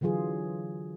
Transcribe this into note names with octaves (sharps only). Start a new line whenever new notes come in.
D3 E3 F#3 F4 G#4